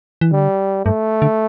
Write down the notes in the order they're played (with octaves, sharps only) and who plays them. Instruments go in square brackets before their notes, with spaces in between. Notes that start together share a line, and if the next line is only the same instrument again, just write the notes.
[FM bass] E3
[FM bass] D3 [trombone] G3
[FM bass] G2 [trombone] A3
[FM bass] D3